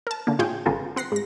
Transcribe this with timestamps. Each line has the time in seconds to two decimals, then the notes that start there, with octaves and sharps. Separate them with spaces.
0.07 A#4 A5
0.27 D3 A#3
0.39 A2 F4 G#4 C#5 G5
0.66 G#1 C#3 B3 F4 A4
0.96 C4 F#5 A#6 C7
1.12 G#2 A#6